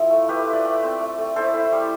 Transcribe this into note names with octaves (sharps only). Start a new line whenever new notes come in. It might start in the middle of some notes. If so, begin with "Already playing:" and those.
Already playing: F3 E4 A4
A3
A3 G4 B4
F4
B4 D5
A3
C4
A3
A3
E4 A4 C5
E4
G3